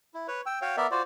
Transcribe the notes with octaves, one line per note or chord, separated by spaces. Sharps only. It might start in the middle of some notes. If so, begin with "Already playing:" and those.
E4
B4 C#5
G5 E6
F#4 C#5 F5 G5
B3 A#4 D5 E5
F4 F#4 C5 D5